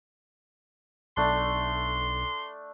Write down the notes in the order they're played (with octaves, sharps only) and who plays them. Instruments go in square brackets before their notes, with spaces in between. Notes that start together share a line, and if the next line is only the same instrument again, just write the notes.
[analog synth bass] B1 [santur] A3 D4 [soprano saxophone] C6